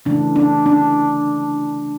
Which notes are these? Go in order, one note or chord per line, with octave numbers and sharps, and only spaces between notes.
C#3 E3 A3 D4
D4
D4